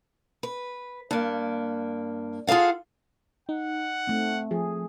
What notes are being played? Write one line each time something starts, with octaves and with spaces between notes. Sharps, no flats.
B4
G2 A#3
F4 G#4 A4 F5 F#5
D#4 F#5
A3 C4
F3 G#4